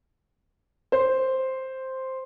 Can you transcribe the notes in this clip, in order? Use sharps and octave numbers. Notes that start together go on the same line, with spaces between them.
C5